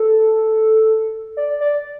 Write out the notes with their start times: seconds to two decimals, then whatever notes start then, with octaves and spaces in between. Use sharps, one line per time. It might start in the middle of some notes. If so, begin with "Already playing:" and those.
Already playing: A4
1.37 D5
1.61 D5